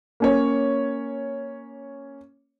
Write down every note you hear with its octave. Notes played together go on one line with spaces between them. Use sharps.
A#3 C#4 C#5